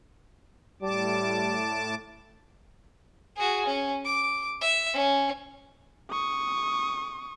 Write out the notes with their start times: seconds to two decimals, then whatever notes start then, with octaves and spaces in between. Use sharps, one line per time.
0.82 A2 G3 A5 D6
3.37 F#4 G#4
3.66 C#4
4.05 D6
4.61 E5
4.94 C#4
6.11 C#6 D#6